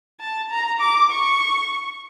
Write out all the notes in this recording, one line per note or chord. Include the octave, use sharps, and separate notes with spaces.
A5
A#5
D6
C#6